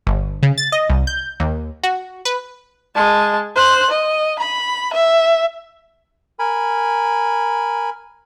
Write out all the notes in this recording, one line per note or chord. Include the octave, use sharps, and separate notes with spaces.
G1
C#3
A6
D#5
C2
G6
D#2
F#4
B4
G#3 A5
C5 F#6
D#5
B5
E5
A#4 G#5 B5